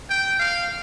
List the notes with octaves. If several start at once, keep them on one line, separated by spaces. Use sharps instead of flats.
G5
F5